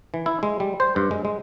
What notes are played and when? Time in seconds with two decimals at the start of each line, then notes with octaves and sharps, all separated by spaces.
0.14 E3
0.26 E4
0.43 G#3
0.60 G3
0.80 C5
0.96 G2
1.11 G#3
1.25 G#3